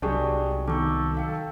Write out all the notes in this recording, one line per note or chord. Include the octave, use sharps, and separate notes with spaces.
C2 F#3 D4 G4 G#4 D5 G#5 C#6
D#3 B3 A4 C#6 D6
F5 G5